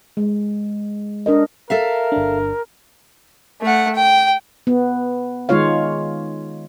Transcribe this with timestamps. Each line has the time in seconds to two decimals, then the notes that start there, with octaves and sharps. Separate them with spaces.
0.17 G#3
1.26 D4 A#4 D#5
1.70 A4 A#4 E5 F5
2.12 G1 D4
3.62 A3 F#5
3.95 G5
4.67 B3
5.49 D#3 G#3 D#4 F4 C#5 F5